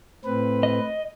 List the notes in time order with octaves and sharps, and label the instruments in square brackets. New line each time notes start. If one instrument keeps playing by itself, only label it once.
[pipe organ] A2 C4 B4
[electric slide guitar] D#5